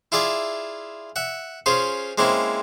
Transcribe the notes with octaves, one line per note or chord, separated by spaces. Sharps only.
E4 F4 G#4 D5 E5
E5 F#5
C#4 F4 G#4 C5
G#3 A#3 C4 C#4 E4